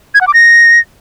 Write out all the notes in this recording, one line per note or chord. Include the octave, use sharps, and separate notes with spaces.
G#6
F#5
D6
A#6